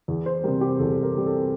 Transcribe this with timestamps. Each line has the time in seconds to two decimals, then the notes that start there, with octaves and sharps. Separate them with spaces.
0.08 E2
0.26 C5
0.44 C3 G3 A#4
0.61 G4
0.79 E2 A4
1.03 A#4
1.15 C3 G3
1.26 A4